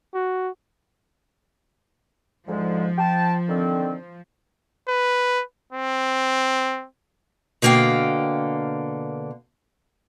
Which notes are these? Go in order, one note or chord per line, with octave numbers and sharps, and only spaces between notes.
F#4
D2 G#2 F3 G#3
G5 A5
D3 D#3 C4
B4
C4
B2 D3 A#3 F5 G5